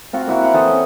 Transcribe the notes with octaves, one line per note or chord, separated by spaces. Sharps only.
C4 F4 F#4
A#3 E4 F#4
F5 F#5
E3 A4 C5 D#5
C#4